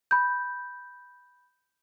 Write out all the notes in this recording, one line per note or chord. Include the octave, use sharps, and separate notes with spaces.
B5 G6